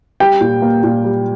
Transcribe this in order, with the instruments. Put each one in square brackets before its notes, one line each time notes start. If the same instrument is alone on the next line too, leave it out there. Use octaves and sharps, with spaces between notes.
[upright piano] G3 [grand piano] G5
[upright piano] A#2
A#3
A#2
G3